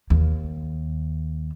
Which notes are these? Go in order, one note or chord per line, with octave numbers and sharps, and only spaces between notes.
D#2